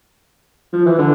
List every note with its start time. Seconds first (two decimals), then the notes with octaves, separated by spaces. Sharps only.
0.73 F3
0.86 E3
0.99 D3